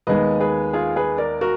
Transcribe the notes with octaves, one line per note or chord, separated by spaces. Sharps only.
D#2 D#3 G#3 B3 B4 D#5
G#4 B4
F4 G#4
G#4 B4
A#4 D5
F#4 A#4